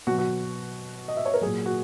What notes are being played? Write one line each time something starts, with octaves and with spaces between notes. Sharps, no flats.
B2 F#3 F#4
F#4
D#5
E5
C#5
A#4
A#2 F#3 G#4
F#4